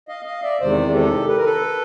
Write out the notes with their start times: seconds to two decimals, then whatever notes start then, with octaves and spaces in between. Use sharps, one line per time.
0.08 D#5 F5
0.25 D#5 F5
0.43 D5 E5
0.60 E2 C3 D#3 G#3 C5 D5
0.94 G4 A4
1.29 B4
1.37 A#4
1.45 A4 B4